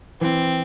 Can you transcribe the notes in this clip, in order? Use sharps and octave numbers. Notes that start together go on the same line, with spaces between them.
E3 C4